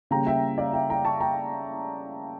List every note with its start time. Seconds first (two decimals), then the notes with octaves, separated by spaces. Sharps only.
0.11 C#3 G3 A#3 G5 A#5
0.27 E5 G5
0.58 D5 F5
0.73 E5 G5
0.90 G5 A#5
1.05 A5 C#6
1.20 G5 A#5